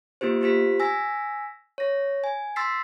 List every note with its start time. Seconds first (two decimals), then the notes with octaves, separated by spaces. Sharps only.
0.21 A#3 B3 F4 G4 C5
0.41 B3 F4 G4 C5 B6
0.80 G#5 E6 A#6 B6
1.78 C#5 A#6
2.24 G#5
2.56 C6 E6 A6 B6 C7